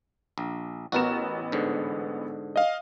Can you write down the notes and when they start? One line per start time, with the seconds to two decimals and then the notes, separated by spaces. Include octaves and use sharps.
0.38 A#1
0.92 A1 B3 F#4 A#4 E7
1.52 G#2 D3
2.56 D#5 F5